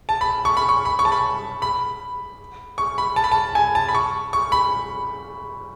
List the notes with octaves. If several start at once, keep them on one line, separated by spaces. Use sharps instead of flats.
A5
B5
C#6
B5
C#6
B5
C#6
A5
B5
B5
C#6
B5
A5
B5
A5
G#5
A5
B5
C#6
C#6
B5